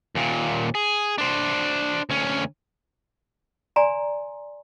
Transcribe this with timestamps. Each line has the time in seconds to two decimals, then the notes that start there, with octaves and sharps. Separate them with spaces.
0.15 D#2 A#2
0.75 G#4
1.18 D4 C5
2.10 D2 C#4
3.76 D5 G#5 A#5 C6